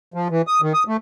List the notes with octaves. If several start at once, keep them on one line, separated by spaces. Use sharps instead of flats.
F3
E3
D#6
D#3
D#6
A3